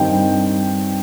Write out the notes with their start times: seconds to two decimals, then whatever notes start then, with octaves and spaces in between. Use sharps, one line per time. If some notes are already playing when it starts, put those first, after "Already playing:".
Already playing: G2 D#3 G3 C4 D#4 G5
0.12 G2